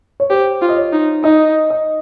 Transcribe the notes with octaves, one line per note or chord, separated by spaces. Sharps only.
C#5
G4 C5
F4
D#5
C#5
D#4
D#4 D#5
D#5